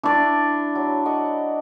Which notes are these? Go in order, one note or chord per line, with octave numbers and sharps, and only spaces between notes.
D4 E4 B4 D5
F#3
D#5 F#5 C#6